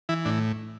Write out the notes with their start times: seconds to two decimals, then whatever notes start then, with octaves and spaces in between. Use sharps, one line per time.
0.09 E3 E4
0.25 A2 D4